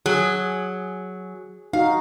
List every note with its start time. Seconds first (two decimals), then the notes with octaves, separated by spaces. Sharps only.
0.06 F#3 G#4
1.73 D#4 F#4 F5